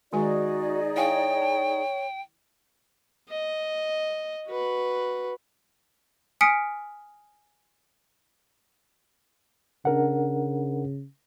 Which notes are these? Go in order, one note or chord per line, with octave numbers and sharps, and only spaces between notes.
D#3 G#3 D#4 F#4 G#4 D5 G#5
E4 C#5 F5 G5 G#5
A5
D#5
F#4 B4
G#5 D#6 F6 B6 C#7 D7
C#3 D4 A#4 F#5